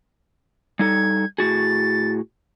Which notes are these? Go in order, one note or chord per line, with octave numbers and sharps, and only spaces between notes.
G3 D#4 A4 G#6
A2 F#4 G#4 A6